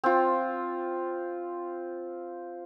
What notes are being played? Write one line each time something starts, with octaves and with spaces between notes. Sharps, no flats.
C4 F4